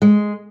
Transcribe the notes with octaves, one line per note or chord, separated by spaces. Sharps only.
G#3